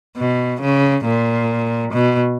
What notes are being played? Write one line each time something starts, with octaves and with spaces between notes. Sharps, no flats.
B2
C#3
A#2
B2